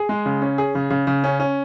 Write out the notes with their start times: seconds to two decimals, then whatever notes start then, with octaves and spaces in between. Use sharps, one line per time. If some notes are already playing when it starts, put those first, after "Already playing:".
Already playing: G#4
0.09 G#3
0.26 C#3
0.42 C#4
0.58 G#4
0.75 C#3
0.90 C#3
1.07 C#3
1.24 C#4
1.40 C#4